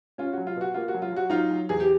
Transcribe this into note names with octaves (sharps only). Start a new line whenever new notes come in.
C#4 F4
F#4
F#3
F4
B2 F#4
A#3 F4
F#4
F#3
F4
F#3 F#4
F#3 D#4 F4
F#3
E2 G#4
G4